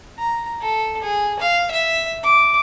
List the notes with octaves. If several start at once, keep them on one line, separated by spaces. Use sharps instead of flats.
A#5
A4
G#4
F5
E5
D6